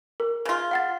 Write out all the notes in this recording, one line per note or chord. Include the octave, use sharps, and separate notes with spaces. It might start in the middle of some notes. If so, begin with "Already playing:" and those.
A#4
C#3 F4
F5 F#5 A6